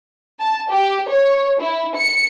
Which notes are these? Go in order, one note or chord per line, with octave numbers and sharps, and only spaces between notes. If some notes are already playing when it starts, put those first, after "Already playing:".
A5
G4
C#5
E4
C#7